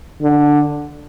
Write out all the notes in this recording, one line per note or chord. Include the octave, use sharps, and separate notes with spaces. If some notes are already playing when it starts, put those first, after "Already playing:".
D3